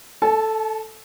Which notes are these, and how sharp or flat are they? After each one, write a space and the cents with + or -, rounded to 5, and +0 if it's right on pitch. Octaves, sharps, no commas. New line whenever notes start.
A4 +0 A5 -40